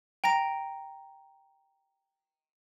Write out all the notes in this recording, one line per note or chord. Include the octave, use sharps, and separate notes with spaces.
G5 A#5 A#6 D7